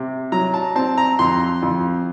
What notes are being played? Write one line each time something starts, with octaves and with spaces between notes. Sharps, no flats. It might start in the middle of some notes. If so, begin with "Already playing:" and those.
Already playing: C3
F#3 A#5
A5
C4 A5
A#5
F2 C6
F2